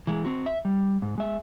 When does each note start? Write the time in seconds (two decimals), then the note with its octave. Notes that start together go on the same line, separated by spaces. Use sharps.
0.07 E3 G#3
0.25 C4 F#4
0.46 E5
0.65 G3
1.02 G#2
1.18 G#3 E5